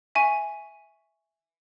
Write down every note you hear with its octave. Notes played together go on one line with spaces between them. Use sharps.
E5 G#5 C#6